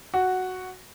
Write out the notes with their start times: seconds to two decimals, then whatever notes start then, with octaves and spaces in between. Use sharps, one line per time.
0.14 F#4